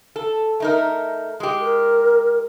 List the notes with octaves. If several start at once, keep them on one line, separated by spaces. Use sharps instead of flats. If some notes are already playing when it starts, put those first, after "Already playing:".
A4
A3 D#4 A#4
G#3 G4
A#4